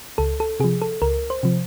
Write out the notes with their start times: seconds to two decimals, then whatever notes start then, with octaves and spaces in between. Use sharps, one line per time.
0.18 C#2 A4
0.40 A4
0.60 C3 F3 G#4
0.82 A4
1.02 C#2 A#4
1.30 C5
1.43 C3 F3